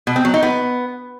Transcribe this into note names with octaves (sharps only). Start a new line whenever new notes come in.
B2
C4
F#3
D#4
B3